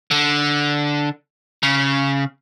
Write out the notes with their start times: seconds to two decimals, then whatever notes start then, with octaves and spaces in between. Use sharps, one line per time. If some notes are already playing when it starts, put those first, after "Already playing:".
0.11 D3
1.63 C#3